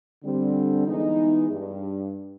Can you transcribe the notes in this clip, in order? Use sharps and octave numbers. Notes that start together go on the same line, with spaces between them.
D3 G3 C4
E3 G#3 B3 D#4
G2